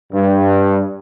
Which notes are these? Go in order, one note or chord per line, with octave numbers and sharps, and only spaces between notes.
G2